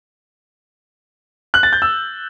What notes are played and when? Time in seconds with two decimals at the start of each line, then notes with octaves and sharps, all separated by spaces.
1.54 F#6
1.63 A6
1.73 G6
1.82 E6